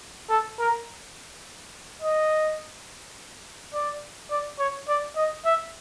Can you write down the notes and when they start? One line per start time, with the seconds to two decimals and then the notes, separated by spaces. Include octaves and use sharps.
0.30 A4
0.59 A#4
2.02 D#5
3.74 D5
4.31 D5
4.59 C#5
4.88 D5
5.16 D#5
5.45 E5